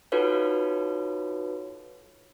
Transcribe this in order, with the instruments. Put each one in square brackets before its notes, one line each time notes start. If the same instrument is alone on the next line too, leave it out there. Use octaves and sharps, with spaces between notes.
[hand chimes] D#4 F4 F#4 A4 B4 C#5